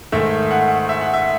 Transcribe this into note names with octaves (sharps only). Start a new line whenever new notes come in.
G#2 D#3 A3 E5
F#5
E5
F#5
E5